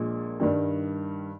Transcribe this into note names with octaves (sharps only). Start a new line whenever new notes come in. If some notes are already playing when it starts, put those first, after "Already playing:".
Already playing: A#1 A#2 G#3
G2 D#3 G3